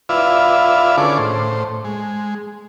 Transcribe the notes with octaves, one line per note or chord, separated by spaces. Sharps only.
E4 F4 B4 D5 E5 F5
D3 C#4 G#4 A4 D5 D6
A2 C5
G#3